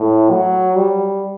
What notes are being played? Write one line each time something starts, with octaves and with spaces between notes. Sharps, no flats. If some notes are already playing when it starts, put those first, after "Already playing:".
Already playing: A2
F#3
G3